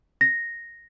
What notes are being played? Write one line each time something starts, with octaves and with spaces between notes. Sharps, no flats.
A#6